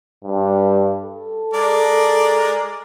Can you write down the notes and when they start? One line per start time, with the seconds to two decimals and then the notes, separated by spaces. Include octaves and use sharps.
0.24 G2
1.04 A4
1.54 G#3 A#4 D5